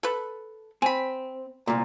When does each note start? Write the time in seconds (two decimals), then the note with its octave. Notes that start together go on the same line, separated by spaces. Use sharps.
0.03 A4 B4
0.82 C4 G#5 B5
1.67 C2 A#2